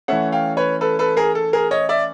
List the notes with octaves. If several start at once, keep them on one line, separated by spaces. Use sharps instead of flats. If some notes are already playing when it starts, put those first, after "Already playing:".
E3 A3 C#4 E5 F#5
F5 G5
B4 C#5
A4 B4
A4 B4
G#4 A#4
A4
G#4 A#4
C#5 D#5
D5 E5